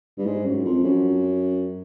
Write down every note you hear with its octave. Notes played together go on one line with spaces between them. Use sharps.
G2
G#2
F#2
F2
F#2